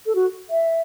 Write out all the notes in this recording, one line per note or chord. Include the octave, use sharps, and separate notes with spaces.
A4
F#4
E5